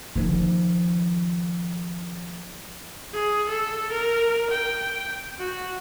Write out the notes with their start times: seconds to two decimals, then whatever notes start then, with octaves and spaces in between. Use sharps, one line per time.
0.16 D#3 F3
3.13 G#4
3.49 A4
3.92 A#4
4.50 G5
5.38 F#4